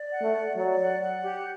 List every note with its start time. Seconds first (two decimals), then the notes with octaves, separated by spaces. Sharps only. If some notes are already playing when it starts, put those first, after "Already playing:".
Already playing: D5
0.11 F#5
0.22 A3
0.34 D5
0.56 F#3 D5
0.79 F#5
1.02 F#5
1.24 G4